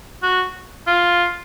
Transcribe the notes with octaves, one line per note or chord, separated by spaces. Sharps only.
F#4
F4